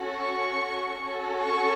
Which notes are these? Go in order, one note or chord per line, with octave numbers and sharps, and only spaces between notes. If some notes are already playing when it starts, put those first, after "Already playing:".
Already playing: C#4 F#4 A4
C#6
C#4 F#4 A4
C#6